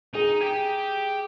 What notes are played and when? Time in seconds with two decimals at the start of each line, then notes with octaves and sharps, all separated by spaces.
0.14 D#4 G#4
0.41 G4